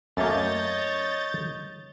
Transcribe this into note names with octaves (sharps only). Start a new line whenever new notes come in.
F#2 A3 A#3 C#5 D#5 G6 A6